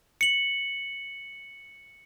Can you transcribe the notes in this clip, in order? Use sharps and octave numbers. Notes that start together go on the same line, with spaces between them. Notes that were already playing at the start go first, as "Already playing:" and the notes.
C#7 F#7